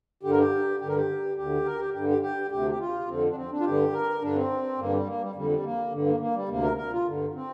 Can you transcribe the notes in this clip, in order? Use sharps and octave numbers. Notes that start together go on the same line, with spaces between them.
G2 D3 G4
A#4
G4
G2 D3 G4
A#4
G4
D2 D3 G4
A#4
G4
G2 D3 G4
G4
G4
D2 C3 G4
G4
F4
F2 D3 C4
D4
C4
D4
F4
G2 D3 G4
A#4
G2 D3 D4
C4
G2 D3 A#3
G3
A#3
G3
F2 D3 G3
G3
A#3
G2 D3
A#3
A#3
G3
D2 C3 A#3
A#4
A#4
F4
G2 D3
C4